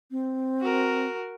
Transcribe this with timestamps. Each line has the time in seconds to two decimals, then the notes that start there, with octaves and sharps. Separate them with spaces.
0.11 C4
0.61 F#4 A#4